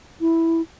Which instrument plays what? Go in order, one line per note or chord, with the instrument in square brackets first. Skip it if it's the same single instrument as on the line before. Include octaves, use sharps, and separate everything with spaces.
[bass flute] E4